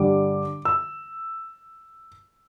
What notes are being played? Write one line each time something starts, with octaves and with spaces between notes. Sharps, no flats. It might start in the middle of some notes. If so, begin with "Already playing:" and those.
Already playing: G2 D3 G3 D4 D6
E6